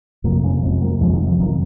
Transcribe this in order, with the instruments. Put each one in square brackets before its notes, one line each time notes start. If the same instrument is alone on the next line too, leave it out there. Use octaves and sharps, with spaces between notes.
[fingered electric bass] F2 C3 F#3 A#3
A#3 C#4
F2 C3 G#3 C4
F#3 A#3
F2 C3 F3 G#3
D#3 F#3
F3
F2 C3 D#3 F#3